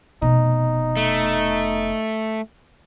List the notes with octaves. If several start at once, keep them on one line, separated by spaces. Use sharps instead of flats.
F1 B2 D#4
A3